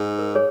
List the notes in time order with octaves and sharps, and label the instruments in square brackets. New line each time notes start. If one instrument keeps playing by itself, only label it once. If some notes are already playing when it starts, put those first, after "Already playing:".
Already playing: [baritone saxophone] G#2
[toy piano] A#4
G#4 C#5